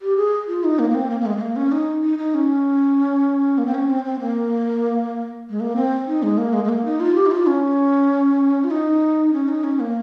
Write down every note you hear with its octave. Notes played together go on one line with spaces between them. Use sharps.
G4
G#4
F4
D#4
A#3
A#3
C4
A#3
A#3
G#3
G#3
A#3
C#4
D#4
D#4
D#4
C#4
A#3
C4
C#4
C4
C4
A#3
G#3
A#3
C4
D#4
G#3
A#3
G#3
G#3
A#3
D#4
F4
G4
D#4
F4
C#4
F4
D#4
C#4
D#4
C#4
A#3